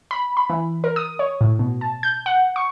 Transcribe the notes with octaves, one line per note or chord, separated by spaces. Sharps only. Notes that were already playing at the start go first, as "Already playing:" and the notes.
B5
B5
E3
A#4
D#6
C#5
A2
B2
A5
G6
F#5
C#6